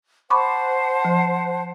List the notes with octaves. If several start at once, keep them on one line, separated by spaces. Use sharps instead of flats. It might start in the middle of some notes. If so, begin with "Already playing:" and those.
C5 F#5 A5 B5 C#6 D6
F3